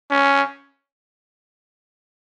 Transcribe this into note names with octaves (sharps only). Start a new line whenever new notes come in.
C#4